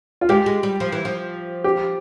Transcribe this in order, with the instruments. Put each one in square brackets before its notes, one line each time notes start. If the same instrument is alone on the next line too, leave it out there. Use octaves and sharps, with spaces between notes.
[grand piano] F4
[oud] G#3 [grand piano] G4
[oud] G#3
G3
F3
E3
F3
[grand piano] G4